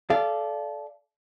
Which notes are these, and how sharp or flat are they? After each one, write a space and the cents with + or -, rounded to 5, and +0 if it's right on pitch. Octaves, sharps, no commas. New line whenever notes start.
A4 -25 D5 +0 F5 -25